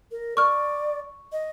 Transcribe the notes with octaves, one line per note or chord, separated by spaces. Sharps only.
A#4
D5 C#6 F6
D#5